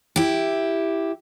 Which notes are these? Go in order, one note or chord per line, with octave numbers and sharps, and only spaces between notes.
E4 G4